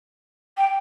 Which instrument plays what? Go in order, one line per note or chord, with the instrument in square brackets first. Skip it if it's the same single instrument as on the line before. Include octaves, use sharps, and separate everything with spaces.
[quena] G5